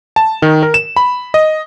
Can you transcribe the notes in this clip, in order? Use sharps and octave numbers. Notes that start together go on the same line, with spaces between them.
A5
D#3
A#4
E7
B5
D#5